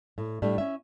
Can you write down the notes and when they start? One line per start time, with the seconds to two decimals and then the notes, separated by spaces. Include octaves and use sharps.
0.18 A2
0.42 A2 G3 A3 D4
0.58 C#4 E5